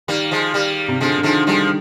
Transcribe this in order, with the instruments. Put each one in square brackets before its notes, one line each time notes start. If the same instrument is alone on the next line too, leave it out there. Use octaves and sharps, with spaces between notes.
[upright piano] D#3 [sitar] G3 A#3
[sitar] F3 G#3
G3 A#3
[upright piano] C3
[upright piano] D3 [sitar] F3 G#3
[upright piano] D3
[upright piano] D#3 [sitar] F3 G#3
[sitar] F3 G#3 [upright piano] G3